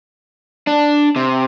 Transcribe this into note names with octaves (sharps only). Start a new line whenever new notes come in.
D4
C3